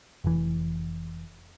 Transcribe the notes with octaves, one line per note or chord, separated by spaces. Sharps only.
F1 E3